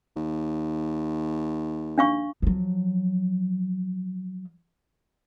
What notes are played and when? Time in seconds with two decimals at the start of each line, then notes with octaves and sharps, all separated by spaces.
0.16 D#2
1.98 D4 F5 C#6
2.42 F3 F#3